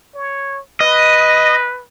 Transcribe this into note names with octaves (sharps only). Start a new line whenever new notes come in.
C#5
B4 D#5